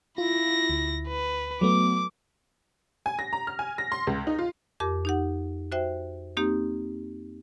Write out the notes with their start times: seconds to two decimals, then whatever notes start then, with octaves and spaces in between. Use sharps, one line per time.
0.18 E4 F4 A#6
0.70 D2
1.08 B4
1.61 F#3 A3 B3 D6
3.06 G#5
3.19 A#6
3.33 A#5
3.47 F6
3.59 G#5
3.78 A#6
3.92 C6
4.07 C#2
4.27 D#4
4.39 F4
4.80 F2 G4 A#4 D6
5.05 D#4 G4 F#5
5.72 F#4 C5 E5 G5
6.37 A#3 C4 D#4 G4